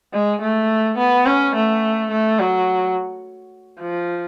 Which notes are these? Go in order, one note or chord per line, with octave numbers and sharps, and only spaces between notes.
G#3
A3
B3
C#4
A3
A3
F#3
F3